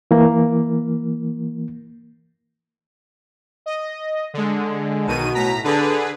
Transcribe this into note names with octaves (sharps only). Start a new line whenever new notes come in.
E3 A#3
D#5
D3 G#3
B1 B2 D#3 D#7
A2 A#5 B6
D3 G#4 B4